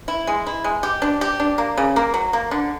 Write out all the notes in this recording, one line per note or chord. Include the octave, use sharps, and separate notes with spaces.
E4
G#3
E4
G#3
G4
D4
G4
D4
A#3
C#3
A#3
F#3
A#3
D3